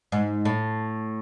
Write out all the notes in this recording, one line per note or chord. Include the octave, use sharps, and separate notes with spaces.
G#2
A2